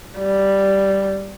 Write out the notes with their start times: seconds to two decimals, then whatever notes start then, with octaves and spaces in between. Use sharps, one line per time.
0.18 G3